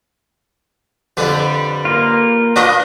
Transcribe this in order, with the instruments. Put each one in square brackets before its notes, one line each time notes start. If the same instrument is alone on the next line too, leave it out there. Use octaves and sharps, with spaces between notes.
[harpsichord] F2 D3 [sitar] G3 B4
[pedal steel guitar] A#3 F4
[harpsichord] D4 [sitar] F4 B4 D#5